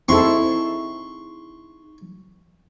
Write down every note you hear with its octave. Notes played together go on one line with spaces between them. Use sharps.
C4 D#4 E4 G#4 A4 C6 C#6